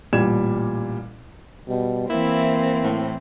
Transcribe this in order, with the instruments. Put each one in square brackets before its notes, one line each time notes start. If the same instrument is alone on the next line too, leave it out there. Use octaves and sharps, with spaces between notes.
[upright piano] A1 A#2 G3 G#6 E7
[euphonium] B2 [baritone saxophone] G3
[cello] E3 C4 [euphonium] A#3 [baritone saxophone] E4
[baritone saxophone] A2